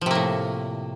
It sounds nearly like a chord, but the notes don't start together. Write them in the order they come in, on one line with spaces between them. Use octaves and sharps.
F3 C3 A#3 A2